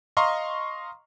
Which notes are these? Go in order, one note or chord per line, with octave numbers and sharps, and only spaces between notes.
D#5 F5 A#5 C6 C#6